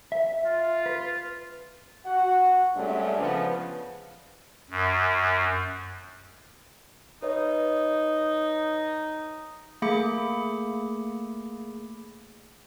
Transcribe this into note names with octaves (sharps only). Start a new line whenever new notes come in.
E5
F4
B4
F#4 F#5
G2 C3 G#3 A3 C#4 D4
C#3 F3 B3
F#2
D#4 B4 C#5 D#5
A3 A#3 G#4 B5 D6 C#7